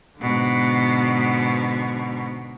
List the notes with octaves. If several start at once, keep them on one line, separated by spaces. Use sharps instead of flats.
G#2 B2 D3